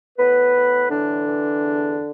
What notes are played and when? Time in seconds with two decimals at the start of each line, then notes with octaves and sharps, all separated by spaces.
0.18 A2 B3 B4
0.54 A2
0.90 D3 E3 D4
1.27 E3
1.63 E2